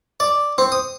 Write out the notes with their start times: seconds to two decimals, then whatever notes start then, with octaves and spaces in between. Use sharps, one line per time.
0.20 D5
0.58 C4
0.72 D#6